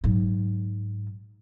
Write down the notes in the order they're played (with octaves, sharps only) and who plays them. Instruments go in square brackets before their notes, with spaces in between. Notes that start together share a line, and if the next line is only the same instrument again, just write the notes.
[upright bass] G#2 F#3